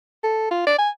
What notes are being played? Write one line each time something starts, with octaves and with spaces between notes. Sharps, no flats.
A4
F4
D5
G#5